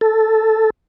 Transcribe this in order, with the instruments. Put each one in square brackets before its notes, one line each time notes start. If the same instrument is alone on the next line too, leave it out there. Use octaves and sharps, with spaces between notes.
[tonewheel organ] A4